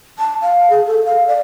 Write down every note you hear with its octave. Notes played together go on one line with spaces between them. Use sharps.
A5
F5
G#4
A4
F5
D5